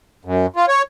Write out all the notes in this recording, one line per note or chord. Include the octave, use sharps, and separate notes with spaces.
F#2
F4
C#5